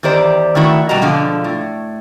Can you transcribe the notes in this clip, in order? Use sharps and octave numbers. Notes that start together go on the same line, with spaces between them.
E2 D#3 G4 C5 D5
D#3 A3 E4 F#4
B2 G3 G#3 F#4 A#5
G#2 B2 D3 F3
A2